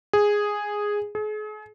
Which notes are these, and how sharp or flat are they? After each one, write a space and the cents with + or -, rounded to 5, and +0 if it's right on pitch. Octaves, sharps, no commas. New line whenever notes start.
G#4 -5
G#4 +40